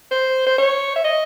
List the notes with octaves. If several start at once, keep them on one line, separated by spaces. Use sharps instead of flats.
C5
C5
C#5
E5
D#5